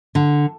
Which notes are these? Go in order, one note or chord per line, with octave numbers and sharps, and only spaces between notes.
D3